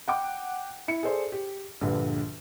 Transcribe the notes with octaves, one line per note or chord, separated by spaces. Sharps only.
F#5 G5 D6
E4 C#7
G#4 A4 C5 D5
G4
A#1 G2 D3 G4 B4